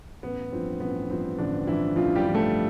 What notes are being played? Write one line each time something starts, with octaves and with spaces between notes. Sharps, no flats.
A1 B3
G2 F3 C4
A1 B3
G2 F3 C4
A1 D3 D4
G2 E3 F3 E4
A1 F3 F4
G3 G4
G2 F3
A3 A4